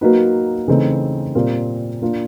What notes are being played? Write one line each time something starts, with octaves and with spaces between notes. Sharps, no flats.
F#3 A#3 D#4 F#4 B4
C#3 E3 A3 C4 D#4
A#2 G3 C4 F4 A#4
A#3 D4 F4